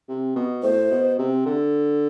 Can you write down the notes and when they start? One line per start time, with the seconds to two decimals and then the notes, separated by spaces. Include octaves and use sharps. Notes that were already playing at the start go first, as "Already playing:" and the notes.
0.08 C3
0.36 B2
0.63 A2 C5
0.91 B2
1.18 C3
1.46 D3